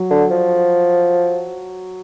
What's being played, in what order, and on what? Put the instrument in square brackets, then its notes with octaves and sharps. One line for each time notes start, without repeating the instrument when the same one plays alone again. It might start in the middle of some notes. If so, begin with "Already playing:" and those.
Already playing: [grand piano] F#3
[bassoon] D3
F3